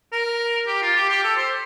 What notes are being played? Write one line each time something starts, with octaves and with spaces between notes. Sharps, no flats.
A#4
G4
F4
G4
G4
A4
C5